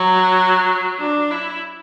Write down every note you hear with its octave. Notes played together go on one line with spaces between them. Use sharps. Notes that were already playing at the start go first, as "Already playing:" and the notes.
Already playing: F#3
D4
E4